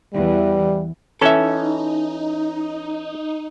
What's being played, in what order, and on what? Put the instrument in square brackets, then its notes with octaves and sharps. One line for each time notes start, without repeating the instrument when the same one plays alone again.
[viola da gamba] E2 E3 [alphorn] G3
[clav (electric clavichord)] E3 C#4 A5 [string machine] D#4 [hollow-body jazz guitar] A4 E5